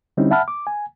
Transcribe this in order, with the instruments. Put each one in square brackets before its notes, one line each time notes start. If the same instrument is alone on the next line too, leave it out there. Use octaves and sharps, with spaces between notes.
[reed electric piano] D3 G3 C4 C#4 D#4 E4
E5 F#5 A5 B5 F6
D6
G#5